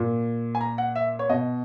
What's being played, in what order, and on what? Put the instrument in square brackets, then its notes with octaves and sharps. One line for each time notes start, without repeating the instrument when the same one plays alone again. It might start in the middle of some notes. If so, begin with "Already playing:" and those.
Already playing: [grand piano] A#2
G#5
A#5
F#5
E5
C#5
B2 D#5